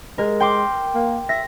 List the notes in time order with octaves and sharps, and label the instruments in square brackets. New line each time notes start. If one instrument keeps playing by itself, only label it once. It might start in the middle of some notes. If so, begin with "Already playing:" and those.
[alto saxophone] G#3 [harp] A#4
[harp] G5 C6 D6
[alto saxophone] A#3
[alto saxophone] E5 [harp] A#6